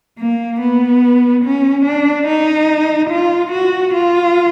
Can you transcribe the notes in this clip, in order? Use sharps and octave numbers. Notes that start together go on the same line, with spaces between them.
A#3
B3
C#4
D4
D#4
F4
F#4
F4